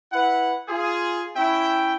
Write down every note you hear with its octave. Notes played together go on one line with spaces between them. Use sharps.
E4 B4 F#5
F4 G#4
C#4 E4 E5 G5